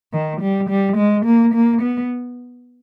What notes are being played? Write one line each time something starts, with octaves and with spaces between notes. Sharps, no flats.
D#3
G3
G3
G#3
A#3
A#3
B3